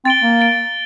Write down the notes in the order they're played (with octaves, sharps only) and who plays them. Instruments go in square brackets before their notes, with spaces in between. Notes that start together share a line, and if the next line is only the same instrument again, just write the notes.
[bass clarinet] C4 [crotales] A6 D7 G7
[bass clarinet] A#3
[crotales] A6 D7 G7